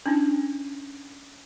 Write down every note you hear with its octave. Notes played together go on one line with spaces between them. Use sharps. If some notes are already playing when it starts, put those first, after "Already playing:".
C#4 D4 E4